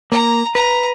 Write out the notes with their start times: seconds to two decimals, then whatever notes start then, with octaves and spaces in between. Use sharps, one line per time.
0.12 A#3 A#5
0.55 B4 A#5